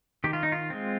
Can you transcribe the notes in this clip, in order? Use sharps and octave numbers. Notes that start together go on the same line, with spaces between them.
D#3 G4
F4
D#4
F4
G#3 C4